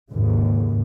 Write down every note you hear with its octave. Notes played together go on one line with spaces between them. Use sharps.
D#2 G#2 C#3